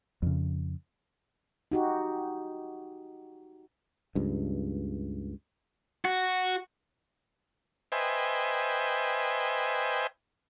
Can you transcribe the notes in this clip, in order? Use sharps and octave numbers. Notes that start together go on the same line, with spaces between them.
F2 C#3
D#4 F#4 G4
C#2 G2
F#4
B4 C5 D#5 E5 G5 G#5